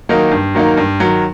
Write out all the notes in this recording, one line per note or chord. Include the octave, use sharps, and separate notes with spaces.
D#3 F#3 A#3 D#4
G2
D#3 F#3 A#3 D#4
G2
D#3 F#3